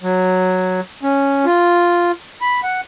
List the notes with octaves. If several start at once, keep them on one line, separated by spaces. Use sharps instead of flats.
F#3
C#4
F4
B5
F#5